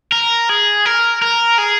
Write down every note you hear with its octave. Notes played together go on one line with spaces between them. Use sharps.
A#4
G#4
A#4
A#4
G#4